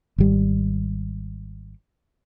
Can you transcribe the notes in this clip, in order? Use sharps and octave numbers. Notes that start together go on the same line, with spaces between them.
G#1 G3